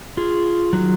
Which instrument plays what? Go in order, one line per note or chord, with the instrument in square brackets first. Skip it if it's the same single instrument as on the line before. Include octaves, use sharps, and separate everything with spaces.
[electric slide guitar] F4 G#4
D#3 F#3